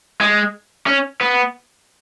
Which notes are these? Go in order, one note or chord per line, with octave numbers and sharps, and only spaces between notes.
G#3
C#4
B3